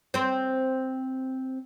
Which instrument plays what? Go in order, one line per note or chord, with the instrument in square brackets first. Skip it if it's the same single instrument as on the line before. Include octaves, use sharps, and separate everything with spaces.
[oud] C4 C5